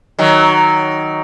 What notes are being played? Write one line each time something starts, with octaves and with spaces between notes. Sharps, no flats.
D#3 F#3